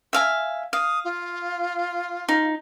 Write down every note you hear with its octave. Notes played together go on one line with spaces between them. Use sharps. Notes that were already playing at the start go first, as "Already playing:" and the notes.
E5 F5 G#5
F5 D#6
F4
D#4